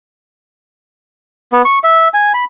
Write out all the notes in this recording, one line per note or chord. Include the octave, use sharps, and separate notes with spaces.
B3
C#6
E5
G#5
B5